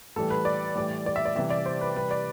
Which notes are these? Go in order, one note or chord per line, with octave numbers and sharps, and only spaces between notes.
A2 E3 G3 A4
B4
D5
A2 E3 G3
D5
E5
D5
C3 E3 G3 E5
D5
C5
B4
C3 E3 G3 B4
D5